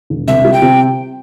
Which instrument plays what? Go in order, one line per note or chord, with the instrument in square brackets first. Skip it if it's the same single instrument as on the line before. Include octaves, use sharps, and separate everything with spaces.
[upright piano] E1
[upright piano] C2 [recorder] E5
[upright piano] G3
[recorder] G5
[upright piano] C3